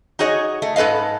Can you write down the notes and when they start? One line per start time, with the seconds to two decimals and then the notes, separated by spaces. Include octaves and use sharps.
0.19 D#4 F#4 G#4 C#5 D#5
0.62 A3
0.76 G#2 A4 B4 D#5 F5